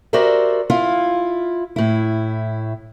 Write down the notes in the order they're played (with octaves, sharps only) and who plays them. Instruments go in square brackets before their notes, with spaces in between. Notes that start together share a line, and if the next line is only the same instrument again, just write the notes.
[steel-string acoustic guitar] F#4 G4 A#4 C5 D5 E5
E4 F4 F5
A2 E4